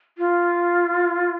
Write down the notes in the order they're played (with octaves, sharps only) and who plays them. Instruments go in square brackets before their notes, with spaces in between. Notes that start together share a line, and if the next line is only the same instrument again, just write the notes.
[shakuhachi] F4